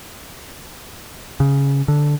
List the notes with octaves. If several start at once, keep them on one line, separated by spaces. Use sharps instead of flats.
C#3
D3